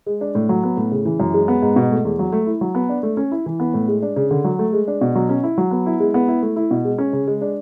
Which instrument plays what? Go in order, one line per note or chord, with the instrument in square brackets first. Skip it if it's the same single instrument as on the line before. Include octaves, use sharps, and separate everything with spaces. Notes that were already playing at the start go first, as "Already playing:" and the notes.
[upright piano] G#3
D4
A2
F#3
B3
A2
C#3
E3
F#2
G#3
B3
G#2
B2
A3
E2
F#3
A3
E4
F#3
B3
D4
A3
C#4
E4
E3
B3
A2
G#3
D4
C#3
D3
F#3
A3
G#3
D4
B2
F#3
C#4
E4
F#3
B3
E4
G#3
B3
E4
A3
E4
B2
G#3
C#4
C#3
G#3
D4